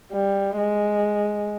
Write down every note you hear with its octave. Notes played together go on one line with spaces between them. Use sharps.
G3
G#3